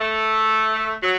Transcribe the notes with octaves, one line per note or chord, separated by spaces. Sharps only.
A3
F#3